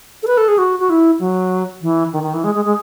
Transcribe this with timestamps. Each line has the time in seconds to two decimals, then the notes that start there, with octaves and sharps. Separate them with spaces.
0.23 A4
0.27 B4
0.37 A4
0.48 G#4
0.58 F#4
0.80 F#4
0.90 E4
1.20 F#3
1.82 E3
2.13 D#3
2.23 D#3
2.34 E3
2.44 G#3
2.55 G#3
2.65 G#3